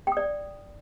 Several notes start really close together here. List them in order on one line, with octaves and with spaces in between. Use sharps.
G5 D#6 D5